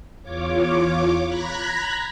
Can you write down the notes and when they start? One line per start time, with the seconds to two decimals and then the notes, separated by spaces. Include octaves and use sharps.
0.22 E2 F4 C#5 D6
1.25 A#5 B5 F#6 G#6 A#6 B6